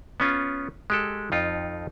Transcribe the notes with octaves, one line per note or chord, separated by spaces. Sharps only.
B3 C#4 F4
G#3 G4 A4
F2 D#4 F4